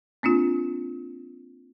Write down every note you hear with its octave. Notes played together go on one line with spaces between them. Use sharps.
A#3 C4 D4 F4